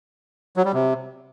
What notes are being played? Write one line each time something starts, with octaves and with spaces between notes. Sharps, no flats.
F#3
G3
C3